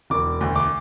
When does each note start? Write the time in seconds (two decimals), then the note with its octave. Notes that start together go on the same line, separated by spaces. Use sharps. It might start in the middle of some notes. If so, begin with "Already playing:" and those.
0.10 E1 D6
0.41 D2
0.56 D6